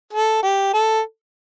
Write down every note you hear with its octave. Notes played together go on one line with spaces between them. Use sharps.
A4
G4
A4